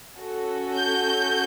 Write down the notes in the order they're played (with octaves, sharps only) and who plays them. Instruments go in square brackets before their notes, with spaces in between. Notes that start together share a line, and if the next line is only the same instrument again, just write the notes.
[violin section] C#4 F#4 A4
G6